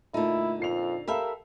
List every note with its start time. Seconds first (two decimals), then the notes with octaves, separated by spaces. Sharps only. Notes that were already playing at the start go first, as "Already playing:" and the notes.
0.14 A#2 D3 A3 A#3 D#4 E4
0.60 F2 A#2 C7 F7
1.08 G4 A4 A#4 E5 F5 B5